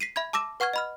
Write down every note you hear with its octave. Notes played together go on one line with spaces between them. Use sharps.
B6 C7 D#7
E5 B5 G#6
A5 D6 E6 A#6 E7
B4 F#5 C#6 F6 G#6
D#5 B5 F6